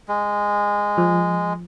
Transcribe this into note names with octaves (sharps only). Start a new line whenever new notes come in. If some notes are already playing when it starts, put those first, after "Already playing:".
G#3
F3